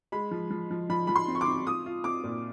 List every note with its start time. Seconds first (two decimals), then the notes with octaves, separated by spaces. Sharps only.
0.12 G#3 B5
0.31 F3
0.51 F3
0.71 F3
0.90 F3 B5
1.07 F3 B5
1.16 C6
1.28 C4
1.35 C#6
1.41 D6
1.48 C4
1.66 F4 D#6
1.86 F4
2.04 C4 D6
2.24 A#2